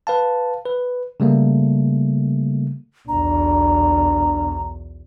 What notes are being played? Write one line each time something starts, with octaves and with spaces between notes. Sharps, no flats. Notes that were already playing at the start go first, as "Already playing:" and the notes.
B4 F5 A5
B4
C#3 G3 A3 A#3
B1 E2 D4 A#5